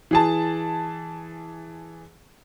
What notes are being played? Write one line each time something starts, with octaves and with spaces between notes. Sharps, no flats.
E3 G#4 A5